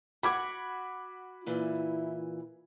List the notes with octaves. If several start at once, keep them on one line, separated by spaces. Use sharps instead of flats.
F#4 F#5 B5 D6 G#6
A#2 E3 E4